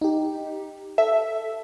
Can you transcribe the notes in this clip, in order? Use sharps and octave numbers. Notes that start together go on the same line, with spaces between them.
D#4 G4
A4 E5